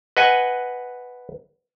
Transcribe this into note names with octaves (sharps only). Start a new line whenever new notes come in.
B4 D#5 F#5 G#5